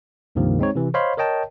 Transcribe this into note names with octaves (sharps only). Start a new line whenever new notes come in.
C#2 G2 C3 D#3 F3 A#3
G#3 C4 D#4 C#5
C3 E3
C5 C#5 D#5 F5 B5 C6
A#4 C#5 D#5 G5 A5